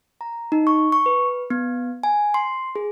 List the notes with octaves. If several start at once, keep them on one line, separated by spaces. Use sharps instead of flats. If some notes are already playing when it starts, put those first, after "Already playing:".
A#5
D#4
C#6
C#6
B4
B3
G#5
C6
G#4